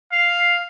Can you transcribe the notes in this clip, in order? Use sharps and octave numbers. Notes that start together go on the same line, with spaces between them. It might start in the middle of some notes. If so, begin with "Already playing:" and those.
F5